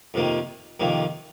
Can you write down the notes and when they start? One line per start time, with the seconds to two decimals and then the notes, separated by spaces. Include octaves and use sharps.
0.14 F2 C3 D#3 A#3
0.80 F2 C3 D#3 A#3